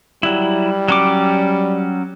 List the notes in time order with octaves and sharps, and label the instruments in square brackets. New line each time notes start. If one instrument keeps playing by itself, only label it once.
[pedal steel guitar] F#3 E4 [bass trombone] G3
[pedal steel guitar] F#3 C#4 D6